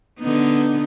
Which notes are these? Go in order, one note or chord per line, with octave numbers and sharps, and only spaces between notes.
D3 B3 D#4